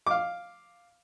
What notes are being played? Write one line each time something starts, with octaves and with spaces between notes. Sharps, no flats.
F5 D6